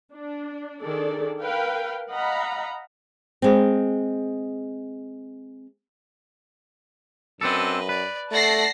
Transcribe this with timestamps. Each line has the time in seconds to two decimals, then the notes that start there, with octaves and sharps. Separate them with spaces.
0.13 D4
0.81 D#3 D4 G#4 A4 D5
1.42 A#4 B4 F5 G5
2.10 D#5 F5 F#5 A#5 B5
3.42 G#3 C4
7.41 F#2 C4 D4 A4 B4 D#5
7.89 B4 D5
8.31 A3 D5 F#5 A5 A#6 C7